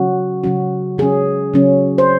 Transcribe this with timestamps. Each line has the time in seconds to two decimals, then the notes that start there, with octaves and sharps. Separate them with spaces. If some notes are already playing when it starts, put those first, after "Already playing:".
Already playing: C#3 F#3 C#4 F#4
0.44 C#3 F#3 C#4 F#4
0.98 C#3 F#3 C#4 G#4
1.54 C#3 F#3 C#4
1.98 C5